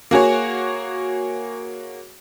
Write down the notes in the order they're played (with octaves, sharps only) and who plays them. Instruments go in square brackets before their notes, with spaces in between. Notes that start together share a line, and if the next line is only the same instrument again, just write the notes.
[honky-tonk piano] A#3 F#4 G#4 C#5